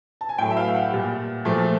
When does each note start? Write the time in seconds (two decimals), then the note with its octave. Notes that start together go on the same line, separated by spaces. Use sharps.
0.21 A5
0.29 G#5
0.38 A2 F#3 A3 G5
0.50 E5
0.57 F5
0.74 F#5
0.92 A#2 G3
1.45 A#2 F3 A3